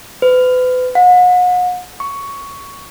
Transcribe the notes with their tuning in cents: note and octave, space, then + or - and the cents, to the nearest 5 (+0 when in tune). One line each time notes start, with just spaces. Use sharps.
B4 +35
F#5 -40
C#6 +10